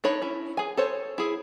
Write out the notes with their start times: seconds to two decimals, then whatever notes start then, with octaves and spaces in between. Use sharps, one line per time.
0.04 D4 D#4 C#5 B5
0.22 C#4 E4
0.57 G#4 G#5
0.77 A4 C5 C#5
1.18 E4 G#4